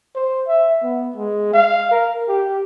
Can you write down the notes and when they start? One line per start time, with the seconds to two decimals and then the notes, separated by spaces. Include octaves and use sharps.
0.15 C5
0.47 E5
0.83 B3
1.15 G#3
1.53 F5
1.91 A#4
2.28 G4